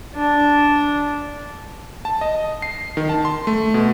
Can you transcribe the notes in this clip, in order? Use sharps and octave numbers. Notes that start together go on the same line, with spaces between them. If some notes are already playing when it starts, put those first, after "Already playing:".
D4
A5
D#5
C7
D#3
A5
C6
A3
B2